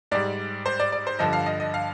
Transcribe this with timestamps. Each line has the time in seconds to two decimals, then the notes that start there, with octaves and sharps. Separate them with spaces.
0.12 G#2 G3 D5
0.66 C5
0.80 D5
0.92 D5
1.07 C5
1.19 G2 D3 F3 D#5
1.33 F5
1.46 D#5
1.60 D#5
1.74 F5